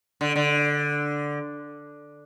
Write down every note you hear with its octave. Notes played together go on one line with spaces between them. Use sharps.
D3
D3